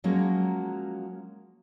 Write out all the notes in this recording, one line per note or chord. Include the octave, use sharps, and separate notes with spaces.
F3 F#3 G#3 A#3 C#4